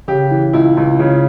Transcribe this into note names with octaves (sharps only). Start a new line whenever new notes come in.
C#3 G4
E3
C#2 E4
C#2
C#3